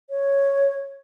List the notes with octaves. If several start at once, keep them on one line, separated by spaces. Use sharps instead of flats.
C#5